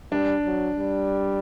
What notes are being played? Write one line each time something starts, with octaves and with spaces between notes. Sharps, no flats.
G3 D4
F#3
G3